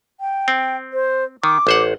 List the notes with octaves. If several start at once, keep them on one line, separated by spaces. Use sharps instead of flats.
G5
C4
C5
D#3 D6
A1 C5 F#5